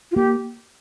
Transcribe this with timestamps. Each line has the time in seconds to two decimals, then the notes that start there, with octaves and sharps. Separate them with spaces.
0.12 F4
0.16 A#3 G4